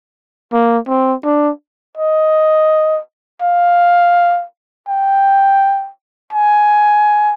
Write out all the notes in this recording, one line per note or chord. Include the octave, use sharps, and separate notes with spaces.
A#3
C4
D4
D#5
F5
G5
G#5